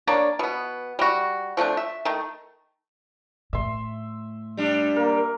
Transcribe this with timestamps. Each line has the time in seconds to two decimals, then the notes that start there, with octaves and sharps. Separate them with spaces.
0.07 A#3 D4 C#5 D5
0.39 B2 B3
0.99 G3 F#4
1.57 F3 A3 C4 D4
1.77 E5
2.05 D#3 A3
3.53 A2 E5 C6
4.57 G3 D4
4.96 A#3 A#4